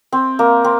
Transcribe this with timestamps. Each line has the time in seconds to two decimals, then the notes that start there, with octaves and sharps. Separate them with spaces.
0.12 C4
0.39 A#3
0.64 C4